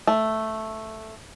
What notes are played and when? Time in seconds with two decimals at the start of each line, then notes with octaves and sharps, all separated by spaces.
0.07 A3